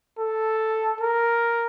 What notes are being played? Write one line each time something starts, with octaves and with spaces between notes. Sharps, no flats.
A4
A#4